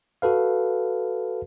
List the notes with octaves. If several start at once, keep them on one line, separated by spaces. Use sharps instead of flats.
F#4 A4 B4 F5